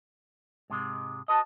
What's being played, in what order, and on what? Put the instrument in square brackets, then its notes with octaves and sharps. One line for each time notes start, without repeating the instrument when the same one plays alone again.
[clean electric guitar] G#2 C3 G#3
[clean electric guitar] F#4 B4 D#5 [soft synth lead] A5